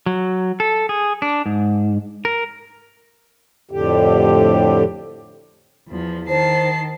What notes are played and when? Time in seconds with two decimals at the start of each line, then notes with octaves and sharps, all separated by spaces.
0.06 F#3
0.60 A4
0.89 G#4
1.22 D4
1.46 G#2
2.25 A#4
3.71 F2 A2 D3 G4
5.88 E2 F3
6.29 D#3 C5 A5 C7